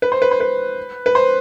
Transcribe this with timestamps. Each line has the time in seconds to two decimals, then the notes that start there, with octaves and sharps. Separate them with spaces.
0.02 B4
0.12 C5
0.22 B4
0.31 C5
0.40 B4
1.06 B4
1.15 C5